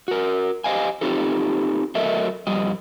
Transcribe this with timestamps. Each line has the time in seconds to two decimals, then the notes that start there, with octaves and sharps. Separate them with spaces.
0.08 F#4 A#4
0.64 G4 C5 D#5 F5 G#5
1.01 C4 D#4 F4 G4 A4
1.95 F#3 A3 A4 A#4 D#5 E5
2.47 F2 G3 D#5